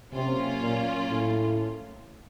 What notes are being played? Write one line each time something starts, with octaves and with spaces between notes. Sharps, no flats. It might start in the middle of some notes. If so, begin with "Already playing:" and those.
C3 F#3 A#3 C#4 F4
A#2
A2